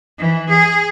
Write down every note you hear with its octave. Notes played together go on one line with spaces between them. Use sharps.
E3
G#4